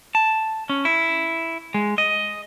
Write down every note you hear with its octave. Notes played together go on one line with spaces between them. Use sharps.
A5
C#4
E4
G#3
D#5